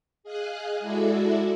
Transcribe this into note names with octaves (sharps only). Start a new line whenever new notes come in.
G#4 D#5 F5 G#5 F#6
G#3 E4 F#4 A4 D5 E5